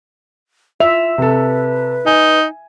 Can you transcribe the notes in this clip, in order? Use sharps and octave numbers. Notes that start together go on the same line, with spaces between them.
F4 E5 F7
C3 A4 B4
D#4 G#5